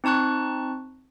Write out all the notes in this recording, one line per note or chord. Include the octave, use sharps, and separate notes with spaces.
C4 D#4 A5 C#6 F#6